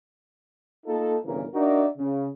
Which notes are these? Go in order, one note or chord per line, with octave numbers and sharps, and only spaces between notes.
A#3 D#4 F4 A4
G1 C2 C#3 E3 A#4
D4 D#4 F#4 A#4 D5 E5
C#3